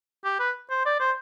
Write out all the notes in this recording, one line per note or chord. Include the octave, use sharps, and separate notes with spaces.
G4
B4
C5
D5
C5